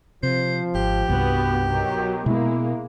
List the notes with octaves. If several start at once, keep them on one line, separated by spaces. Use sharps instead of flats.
C3 F3 C5
G#1 G4
C2 G2 B3 F#4
B2 D#3 F#3
B2 G#3 A#3 B3 E4